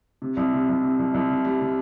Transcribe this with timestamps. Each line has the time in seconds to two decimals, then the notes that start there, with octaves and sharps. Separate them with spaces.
0.22 C3
0.37 C2
0.53 C3
0.69 C2
0.83 C3
0.99 C2
1.14 C2
1.29 C3
1.45 G3
1.61 C3